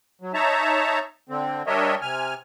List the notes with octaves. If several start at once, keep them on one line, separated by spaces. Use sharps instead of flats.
F#3
D#4 C#5 E5 A5 A#5
D3 C4
G3 D4 A#4 C#5 D#5 E5
C3 G#5 F6